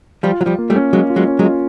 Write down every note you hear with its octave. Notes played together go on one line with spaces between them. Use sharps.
F3 G3 F4
F#3 F4
F3 G3
A#3
G3 A3
C#4
F#3 G#3 A#3
F4
F#3 G#3
C#4
F#3 G#3
F4